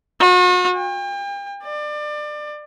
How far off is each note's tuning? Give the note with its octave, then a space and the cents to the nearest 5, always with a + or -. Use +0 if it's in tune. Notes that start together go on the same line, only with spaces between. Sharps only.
F#4 -40
G5 +40
D5 +25